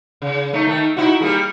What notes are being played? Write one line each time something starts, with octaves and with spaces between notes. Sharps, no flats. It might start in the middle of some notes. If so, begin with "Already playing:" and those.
C#3
A3 D#4
D#3 A3
D#4 E4 F#4
G3 A#3 G#4